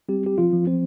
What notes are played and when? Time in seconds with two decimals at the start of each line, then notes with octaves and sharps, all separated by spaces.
0.09 G3 C4 G4
0.26 G4
0.38 F3 F4
0.53 F3
0.67 C4 C5